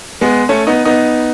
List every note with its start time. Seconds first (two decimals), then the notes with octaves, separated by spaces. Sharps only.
0.21 G#3 B3
0.49 A3 C#4
0.67 B3 D#4
0.85 B3 D#4